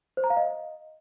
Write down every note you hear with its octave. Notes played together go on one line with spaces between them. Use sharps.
C5
A#5
F5
D#5